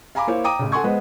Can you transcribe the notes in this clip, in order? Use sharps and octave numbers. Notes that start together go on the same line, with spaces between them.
F5 G#5 A#5 B5 D6
A#3 E4 C5 C#5 F5
G5 A#5 D6 D#6 D#7
A1 C#3
A4 F#5 G#5 C6 C#6 G#6
G#3 B3 B4 C5 D#5 F#5